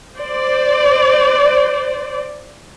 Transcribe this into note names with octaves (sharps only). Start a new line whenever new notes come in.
C5 D5